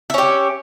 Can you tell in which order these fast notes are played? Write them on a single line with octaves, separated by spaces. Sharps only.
E5 C#4 G4